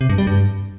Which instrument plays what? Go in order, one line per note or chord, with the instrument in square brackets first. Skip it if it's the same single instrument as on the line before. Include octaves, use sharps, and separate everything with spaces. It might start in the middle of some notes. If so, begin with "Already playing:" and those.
[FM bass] C3
G2
G3
G2